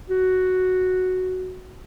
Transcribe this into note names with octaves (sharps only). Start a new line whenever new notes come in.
F#4